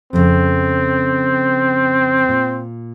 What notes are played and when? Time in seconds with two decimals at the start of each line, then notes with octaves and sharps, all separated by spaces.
0.13 F2 A#2 C#3 C4
2.29 A#2